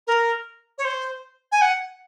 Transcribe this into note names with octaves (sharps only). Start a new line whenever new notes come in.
A#4
C#5
C5
G#5
F#5